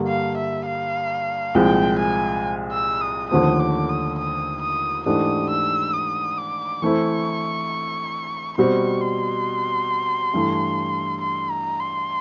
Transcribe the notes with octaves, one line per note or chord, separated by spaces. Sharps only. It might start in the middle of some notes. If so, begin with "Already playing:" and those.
Already playing: G2 D3 G3 A#3
F5
E5
F5
C2 A#2 F3 G#3 G5
G#5
E6
D#6
D#2 D3 F3 A3 C4 D#6
D6
D#6
D#6
D#6
G#2 E3 A3 D4 G4 D#6
E6
D#6
D6
E3 A3 C4 E4 C#6
B2 G3 C4 C#6
C6
G2 E3 A3
C6
A#5
C6